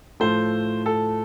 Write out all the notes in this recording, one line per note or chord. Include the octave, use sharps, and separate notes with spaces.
A2 F3 A3 C5
A4